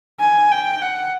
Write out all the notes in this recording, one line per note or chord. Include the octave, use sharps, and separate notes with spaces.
G#5
G5
F#5